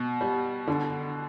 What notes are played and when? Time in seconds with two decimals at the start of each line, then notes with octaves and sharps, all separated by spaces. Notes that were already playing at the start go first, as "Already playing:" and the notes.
Already playing: B2
0.21 G3
0.67 D3